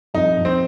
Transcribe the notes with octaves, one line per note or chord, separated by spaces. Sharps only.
F2 D#4
F2
C4